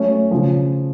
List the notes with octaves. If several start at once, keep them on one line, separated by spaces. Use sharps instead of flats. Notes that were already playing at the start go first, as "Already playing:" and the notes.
Already playing: F#3 A3 C#4
C#3 F3